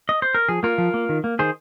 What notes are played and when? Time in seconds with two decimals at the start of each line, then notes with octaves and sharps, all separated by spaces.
0.09 D#5
0.22 C5
0.35 A#4
0.48 F3 G#4
0.63 A#3 F4 A#4
0.78 F3
0.94 A#3
1.09 D#3
1.24 A#3
1.39 D#3 G#4 C5